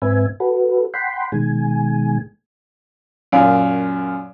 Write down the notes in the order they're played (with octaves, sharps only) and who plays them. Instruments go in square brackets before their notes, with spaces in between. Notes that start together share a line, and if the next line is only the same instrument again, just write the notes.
[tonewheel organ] G#2 C4 B4 E5 G#5
F#4 A4 B4
F#5 G5 B5 C6
B2 D#3 G#3 G#5
[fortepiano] F#2 A#2 F5